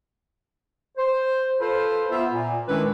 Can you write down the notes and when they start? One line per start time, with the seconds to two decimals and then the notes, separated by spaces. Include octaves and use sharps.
0.97 C5
1.60 F4 A4 B4 C5
2.11 B3 F4 E5
2.32 A#2
2.67 D#3 G#3 C#4 D4 E4 B4